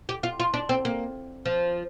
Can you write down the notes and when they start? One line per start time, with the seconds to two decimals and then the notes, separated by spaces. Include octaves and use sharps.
0.09 G4
0.23 F4
0.40 F4
0.54 D4
0.69 C4
0.85 A#3
1.46 F3